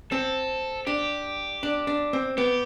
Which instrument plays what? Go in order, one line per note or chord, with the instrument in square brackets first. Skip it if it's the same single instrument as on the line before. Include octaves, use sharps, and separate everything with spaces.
[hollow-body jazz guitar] C4 [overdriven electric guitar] A4
[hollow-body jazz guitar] D4 [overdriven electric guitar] G4
[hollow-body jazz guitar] D4
D4
C4
[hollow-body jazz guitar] B3 [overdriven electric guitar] G4